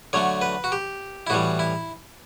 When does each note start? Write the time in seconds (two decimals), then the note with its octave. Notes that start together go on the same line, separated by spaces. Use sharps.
0.13 D3 F#3 A3 C#5
0.42 B4
0.64 F#4
0.72 G4
1.27 E4
1.30 A2 E3 G3 F#4
1.59 E4